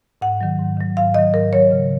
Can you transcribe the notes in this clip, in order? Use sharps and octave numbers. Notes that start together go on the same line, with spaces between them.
G#2 F#5
D#3 F#3
G#2
D#3 F#3
G#2 F5
D#3 F#3 D#5
G#2 A#4
D#3 F#3 C#5
C#3